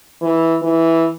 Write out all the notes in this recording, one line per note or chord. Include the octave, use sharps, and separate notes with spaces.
E3
E3